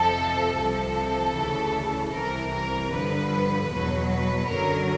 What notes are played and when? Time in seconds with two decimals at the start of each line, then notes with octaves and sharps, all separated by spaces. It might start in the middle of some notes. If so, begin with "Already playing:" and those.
Already playing: F2 C3 F3 A4
0.56 C2 C3 F3 A4
1.35 D2 C#3 E3
2.13 C2 C3 E3 A#4
2.52 A#4
2.92 G2 D3 F3 B4
3.70 E2 B2 F#3 B4
4.09 B4
4.47 F#2 D3 F#3 A#4